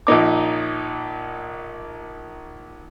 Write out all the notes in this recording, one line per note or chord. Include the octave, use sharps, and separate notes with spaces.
A#1 A#2 D#4 D6